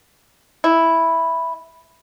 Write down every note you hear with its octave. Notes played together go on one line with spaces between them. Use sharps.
E4